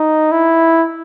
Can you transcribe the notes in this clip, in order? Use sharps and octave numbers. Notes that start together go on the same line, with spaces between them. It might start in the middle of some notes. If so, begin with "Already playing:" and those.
Already playing: D#4
E4